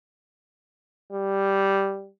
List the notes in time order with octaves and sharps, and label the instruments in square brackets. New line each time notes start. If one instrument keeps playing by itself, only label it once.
[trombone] G3